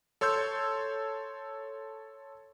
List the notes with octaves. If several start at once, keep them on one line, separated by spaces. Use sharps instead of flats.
A4 C#5 C6 E6 G6